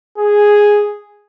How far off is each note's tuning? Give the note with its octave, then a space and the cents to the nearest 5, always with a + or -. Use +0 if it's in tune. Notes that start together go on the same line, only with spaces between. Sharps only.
G#4 +0